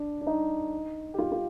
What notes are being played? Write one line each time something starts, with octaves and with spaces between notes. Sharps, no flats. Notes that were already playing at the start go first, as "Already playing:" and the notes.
Already playing: D4
D4
D#4
G4
F4
F4